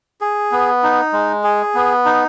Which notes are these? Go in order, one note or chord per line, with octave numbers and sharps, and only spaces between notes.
G#4
B3
D#4
G#3
G#4
B3
D#4